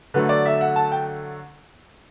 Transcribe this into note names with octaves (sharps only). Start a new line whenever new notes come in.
D3 F#3 A3 B4
D5
E5
F#5
A5
G5